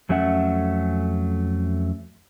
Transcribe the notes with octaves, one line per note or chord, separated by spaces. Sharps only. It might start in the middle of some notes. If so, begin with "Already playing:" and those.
F2 F#3 A3 C#4 E5 F#5